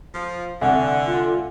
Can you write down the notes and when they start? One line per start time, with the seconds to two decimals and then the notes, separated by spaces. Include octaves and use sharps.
0.14 F3 F4
0.61 C2 D3 E5 F#5 G#5
1.06 F4